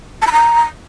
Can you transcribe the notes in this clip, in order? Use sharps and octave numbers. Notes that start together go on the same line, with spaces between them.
A5
B5
A#5